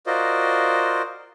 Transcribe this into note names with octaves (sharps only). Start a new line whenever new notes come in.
F4 F#4 A#4 C5 D5 D#5